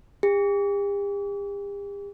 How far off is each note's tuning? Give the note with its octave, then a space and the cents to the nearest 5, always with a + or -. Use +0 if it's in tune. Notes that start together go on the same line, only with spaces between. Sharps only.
G4 +45